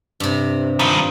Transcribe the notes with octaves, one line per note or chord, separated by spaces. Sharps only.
G2 C3
G2 D#3 F4 B5